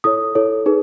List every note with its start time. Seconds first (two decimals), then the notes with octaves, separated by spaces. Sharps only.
0.04 E4 A4 C#5 D#6
0.35 E4 A4 C#5
0.66 D#4 G#4 B4